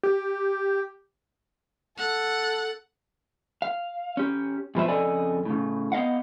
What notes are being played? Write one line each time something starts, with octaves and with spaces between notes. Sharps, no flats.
G4
A4 F#5
F5
C#4 G4
G#2 B2 F3 B4 C5 E5
F2 C#3 A4 D5 D#5 G#5
A2 C#3
B3 D#5 F5 F#5